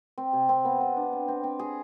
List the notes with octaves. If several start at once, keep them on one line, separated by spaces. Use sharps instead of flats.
C4
C3
C4
B3
B3
D4
C4
C4
C4
G#4